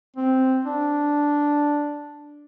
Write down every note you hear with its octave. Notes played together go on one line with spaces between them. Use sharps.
C4
D4